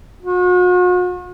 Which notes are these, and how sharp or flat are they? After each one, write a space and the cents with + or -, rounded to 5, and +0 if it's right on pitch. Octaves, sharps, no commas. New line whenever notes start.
F#4 -45